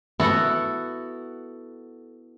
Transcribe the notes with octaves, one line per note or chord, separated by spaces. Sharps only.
B3 E4 F#4 A4